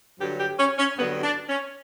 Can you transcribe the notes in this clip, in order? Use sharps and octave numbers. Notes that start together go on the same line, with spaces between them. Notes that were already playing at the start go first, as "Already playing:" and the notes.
G2 D3 F#3 G4
G4
C#4
C#4
G2 D3 F#3 B3
D4
C#4